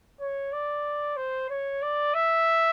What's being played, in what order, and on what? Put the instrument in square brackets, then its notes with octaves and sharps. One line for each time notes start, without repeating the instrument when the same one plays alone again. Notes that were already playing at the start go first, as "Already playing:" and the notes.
[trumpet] C#5
D5
C5
C#5
D5
E5